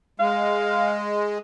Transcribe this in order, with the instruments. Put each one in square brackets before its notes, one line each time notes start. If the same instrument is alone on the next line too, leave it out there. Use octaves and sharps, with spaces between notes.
[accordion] G#3 [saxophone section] F5